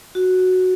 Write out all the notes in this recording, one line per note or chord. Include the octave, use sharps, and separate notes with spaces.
F#4